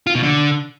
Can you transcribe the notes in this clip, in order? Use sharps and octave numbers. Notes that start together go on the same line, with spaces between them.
F4
B2
D3